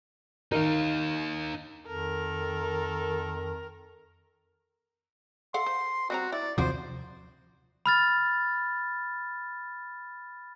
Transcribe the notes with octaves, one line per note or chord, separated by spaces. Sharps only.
D#3 D#4 A#4 F5
F2 D#3 A4 A#4
A4 F5 F#5 C6
C5
G3 C4 F#4 A#5
E4 D5
D#2 C3 F3 G3 F#4 C5 D5
B5 F6 A6